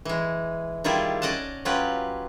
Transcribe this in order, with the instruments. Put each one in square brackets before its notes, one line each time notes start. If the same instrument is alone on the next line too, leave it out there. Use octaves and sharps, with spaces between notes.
[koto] E3 G#3
D#3 G3 E4 F4 G4 G#4
C#4 D5 D#5 F#5 A5
F#3 C#4 F4 G4 B4